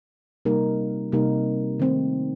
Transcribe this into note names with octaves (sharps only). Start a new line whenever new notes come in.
C3 G3 A#3 D#4 A#4
C3 G3 A#3 D#4 A#4
D#3 A3 C4